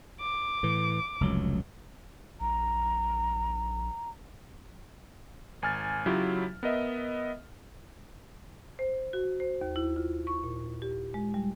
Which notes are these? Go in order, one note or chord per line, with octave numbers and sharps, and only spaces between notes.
D6
A2 E3
F1 C#2 F#3
A#1 A#5
G#1 G#5 F6 A6
C#3 F#3 E4 F4 G4
B3 A#4 D#5 E5
C5
F#4
C5
D#2
E4
F4
C#6
A#2
G4
G#3
G3